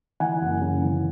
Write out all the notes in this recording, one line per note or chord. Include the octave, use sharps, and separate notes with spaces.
E3 F#5 G#5
F#1
C#3
E3